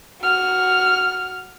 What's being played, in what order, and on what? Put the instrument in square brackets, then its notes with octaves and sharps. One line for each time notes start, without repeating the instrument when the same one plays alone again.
[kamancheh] F#4 F6